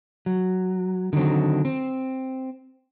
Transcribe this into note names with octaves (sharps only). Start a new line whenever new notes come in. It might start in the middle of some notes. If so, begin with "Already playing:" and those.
F#3
D3 D#3 F#3 C4
C4